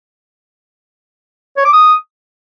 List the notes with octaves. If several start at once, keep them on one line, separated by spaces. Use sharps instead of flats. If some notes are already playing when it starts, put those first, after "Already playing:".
C#5
D6
D#6